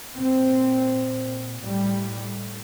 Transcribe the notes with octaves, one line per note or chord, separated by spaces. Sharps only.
A#2 C4
A2 G3